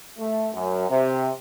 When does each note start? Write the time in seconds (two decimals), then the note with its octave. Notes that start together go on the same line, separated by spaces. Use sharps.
0.19 A3
0.54 F#2
0.90 C3